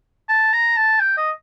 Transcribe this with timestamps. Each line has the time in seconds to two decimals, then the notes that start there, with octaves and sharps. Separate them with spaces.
0.29 A5
0.53 A#5
0.76 A5
1.00 G5
1.17 D#5